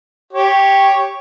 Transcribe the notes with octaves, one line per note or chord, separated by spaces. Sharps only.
G4 C#5